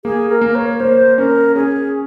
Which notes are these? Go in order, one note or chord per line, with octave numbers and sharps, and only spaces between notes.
A#3 G#4
A#4
A#3
C#5
A#3 C5
C#4 A#4
C#4 G#4